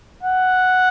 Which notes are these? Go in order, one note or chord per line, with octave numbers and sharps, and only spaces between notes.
F#5